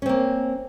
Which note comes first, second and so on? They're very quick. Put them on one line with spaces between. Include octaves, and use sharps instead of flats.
C#4 C4 A#3